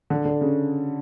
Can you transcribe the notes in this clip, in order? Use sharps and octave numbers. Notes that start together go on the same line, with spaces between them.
D3
D3
C#3